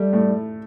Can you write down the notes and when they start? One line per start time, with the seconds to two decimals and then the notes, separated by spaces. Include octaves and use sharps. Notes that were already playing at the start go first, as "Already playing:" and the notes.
Already playing: G3 A3
0.13 A2